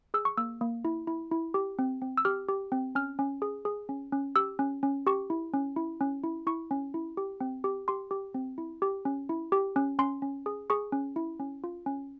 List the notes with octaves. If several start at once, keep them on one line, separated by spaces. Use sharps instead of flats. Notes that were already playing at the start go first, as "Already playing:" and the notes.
G#4 E6
C#6
A#3 E6
A#3
E4
E4
E4
G4
C4
C4
E6
G4 F6
G4
C4
C#4 F6
C#4
G#4
G#4
C#4
C#4
G4 E6
C#4
C#4
G4 C#6
E4
C#4
E4
C#4
E4
E4 C#6
C#4
E4
G4
C4
G4
G4 C6
G4
C4
E4
G4
C#4
E4
G4
C#4
C#4 C6
C#4
G#4
G#4 C#6
C#4
E4
C#4
F4
C#4